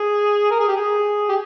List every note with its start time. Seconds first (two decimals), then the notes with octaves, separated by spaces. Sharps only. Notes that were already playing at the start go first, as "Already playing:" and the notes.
Already playing: G#4
0.51 A#4
0.60 G#4
0.68 G4
0.77 G#4
1.29 G4